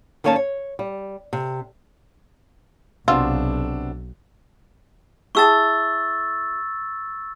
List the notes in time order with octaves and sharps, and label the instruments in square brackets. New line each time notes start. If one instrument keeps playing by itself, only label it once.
[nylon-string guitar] D#3 A#3 C#4 C#5 G#5 A5
C#5
G3
C3
[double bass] B1 [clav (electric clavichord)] C3 B3 F#4 [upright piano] D4 E6 [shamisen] F4
[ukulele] E4 G#4 A5 [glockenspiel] C#6 E6 A6